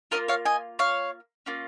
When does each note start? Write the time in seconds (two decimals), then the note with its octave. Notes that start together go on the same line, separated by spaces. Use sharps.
0.11 A#3 C#4 F4 A#4 D#5
0.28 C#5 F5
0.45 D#5 G#5
0.79 C#5 F5
1.46 A#3 C#4 F4